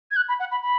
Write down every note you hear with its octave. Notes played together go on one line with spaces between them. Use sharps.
G#6
F#6
B5
F#5
B5
B5